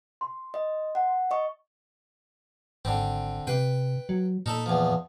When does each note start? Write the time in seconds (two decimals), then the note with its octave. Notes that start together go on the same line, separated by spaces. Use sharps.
0.21 C6
0.54 D#5
0.95 F#5
1.31 D#5 C#6
2.85 G#1 D3 C4
3.47 C3 B4 G5
4.09 F#3
4.46 A#2 D#4 A4 B5
4.66 E2 F3